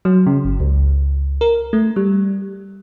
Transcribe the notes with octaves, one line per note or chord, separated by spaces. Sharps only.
F#3
C#3
G1
C#2
A#4
A3
G3